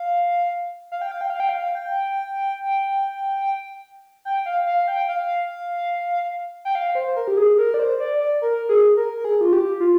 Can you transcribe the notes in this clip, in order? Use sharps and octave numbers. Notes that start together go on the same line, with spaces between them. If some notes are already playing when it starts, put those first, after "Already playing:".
Already playing: F5
F5
G5
F5
G5
F5
G5
F5
G5
G5
F5
F5
G5
F5
G5
F5
C5
A#4
G4
G#4
A#4
D5
C5
D5
D5
A#4
G#4
A#4
A#4
G#4
F4
G4
F4